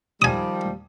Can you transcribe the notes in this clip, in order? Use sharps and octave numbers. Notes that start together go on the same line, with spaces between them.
D#3 F3 G3 G#5 D#6